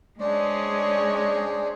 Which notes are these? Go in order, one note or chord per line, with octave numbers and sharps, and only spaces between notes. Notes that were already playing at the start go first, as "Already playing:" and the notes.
G#3 C#4 D4 G#4 C5 D5